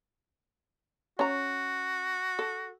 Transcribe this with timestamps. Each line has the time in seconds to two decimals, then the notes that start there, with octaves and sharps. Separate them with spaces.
1.19 C#4 F#4 A#5
2.39 A4